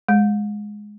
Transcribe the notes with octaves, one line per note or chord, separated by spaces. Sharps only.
G#3